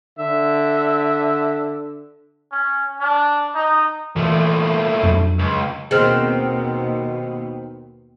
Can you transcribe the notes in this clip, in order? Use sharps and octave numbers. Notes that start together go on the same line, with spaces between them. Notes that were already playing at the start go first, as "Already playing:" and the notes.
D3 E5
C#4
D4
D#4
A#2 E3 A3
F2 F#3 D4
C#2
D#2 B2 D#3 B3 C4 G#4 F6 F#6